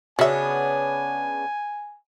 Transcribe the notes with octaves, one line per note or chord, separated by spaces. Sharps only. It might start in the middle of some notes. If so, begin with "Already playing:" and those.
C#3 B3 D4 F#4 E5 G#5